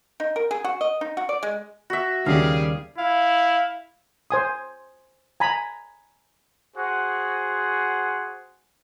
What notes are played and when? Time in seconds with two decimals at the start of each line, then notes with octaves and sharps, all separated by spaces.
0.20 D#4
0.36 A#4
0.51 G#4
0.64 F#4
0.81 D#5
1.01 D#4
1.17 F#4
1.29 D5
1.43 G#3
1.90 F#4 E5
2.26 D#2 C#3 G3 G#4 F5
2.98 E4 F5
4.31 C5 G#5 D#6
5.40 G#5 A#5 B5
6.76 F#4 G#4 C5 F#5